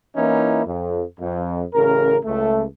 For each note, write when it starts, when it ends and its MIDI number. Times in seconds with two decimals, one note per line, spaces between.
0.16 0.64 52
0.16 0.64 58
0.16 0.64 61
0.16 0.64 63
0.16 0.64 64
0.66 1.02 41
1.20 1.62 41
1.74 2.17 33
1.74 2.17 49
1.74 2.17 70
2.25 2.63 37
2.25 2.63 57